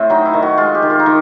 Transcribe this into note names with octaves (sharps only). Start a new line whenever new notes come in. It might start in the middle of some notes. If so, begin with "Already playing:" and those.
Already playing: A2 C4
F#3 D#4
E4
D#3
F#4
G#3 F4
G4
D#3
F4
D#4
D#3